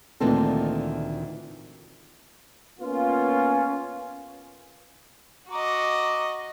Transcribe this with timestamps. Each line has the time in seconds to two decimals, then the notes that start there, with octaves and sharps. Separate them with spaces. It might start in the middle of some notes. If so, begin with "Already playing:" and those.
0.20 D2 A#2 D#3 E3 C4 A4
2.80 A#3 B3 C#4 F4
5.51 F#4 D#5 A#5 D6